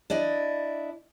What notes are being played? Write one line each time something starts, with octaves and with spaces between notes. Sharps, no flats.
D4 E4 D5 D#5